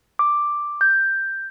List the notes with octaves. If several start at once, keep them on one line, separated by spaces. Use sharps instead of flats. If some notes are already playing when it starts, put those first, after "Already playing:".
D6
G6